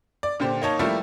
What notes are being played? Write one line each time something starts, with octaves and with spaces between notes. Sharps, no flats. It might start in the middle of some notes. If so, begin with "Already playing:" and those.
D5
A#2 D3 G4 C5
A#3 D#4 C#5 A5
F3 G3 A3 A#3 E4